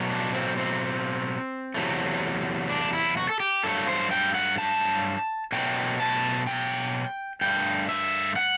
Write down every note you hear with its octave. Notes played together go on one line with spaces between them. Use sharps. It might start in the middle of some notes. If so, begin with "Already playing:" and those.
Already playing: B2 F#3 A3
D4
C4
C4
E2 C3 F#3 A3
D4
E4
F#4
A4
G4
G2 F#3 A3 A4
C5
G5
F#5
A5
B2 F#3 A3 G5
A5
G5
G2 D3 A3 G5
E5
F#5